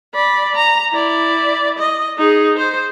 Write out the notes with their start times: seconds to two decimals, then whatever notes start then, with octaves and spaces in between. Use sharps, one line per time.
0.15 D5 B5
0.55 A#5
0.92 E4 D5
1.78 D#5
2.18 D#4 G#4
2.58 C5